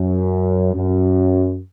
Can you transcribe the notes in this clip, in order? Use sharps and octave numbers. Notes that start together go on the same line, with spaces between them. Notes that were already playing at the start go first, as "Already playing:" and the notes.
Already playing: F#2
F#2